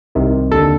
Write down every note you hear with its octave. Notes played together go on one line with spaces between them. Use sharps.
C2 C3 D#3
D#2 D3 A4